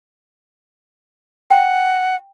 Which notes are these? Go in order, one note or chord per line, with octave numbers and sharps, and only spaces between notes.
F#5 G5